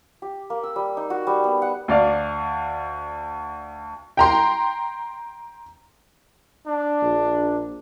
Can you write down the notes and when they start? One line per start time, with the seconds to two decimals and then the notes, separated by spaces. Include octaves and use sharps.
0.22 G4
0.50 A#3
0.63 E6
0.76 G3
0.97 D#4
1.10 F#4
1.27 G3
1.44 B3
1.62 F#5
1.88 D2 D5 F5
4.17 G5 A#5 C6
6.67 D4
7.02 A#1